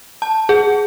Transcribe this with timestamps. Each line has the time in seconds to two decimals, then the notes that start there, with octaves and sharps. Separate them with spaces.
0.22 A5
0.49 G#4